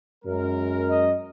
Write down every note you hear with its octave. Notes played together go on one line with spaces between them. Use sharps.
F#2 G#3 A#4
D#5